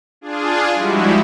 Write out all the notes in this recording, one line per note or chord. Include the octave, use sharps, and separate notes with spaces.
D4 F4 G#4
F3 G3 G#3 E4 F#4 G4